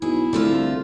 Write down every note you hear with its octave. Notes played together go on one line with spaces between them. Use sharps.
B1 E4 G#4
C2 D3 A3 F4